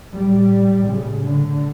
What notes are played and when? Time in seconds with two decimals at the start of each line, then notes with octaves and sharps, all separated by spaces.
0.13 A2 G3
0.86 A2 C#3
1.23 D3